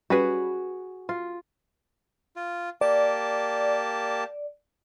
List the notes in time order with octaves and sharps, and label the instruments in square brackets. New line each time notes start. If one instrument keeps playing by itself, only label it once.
[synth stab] G3 C#4 B4 [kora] F#4 G#4
[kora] F4
[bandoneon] F4
[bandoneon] A#3 G4 A5 [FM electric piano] D5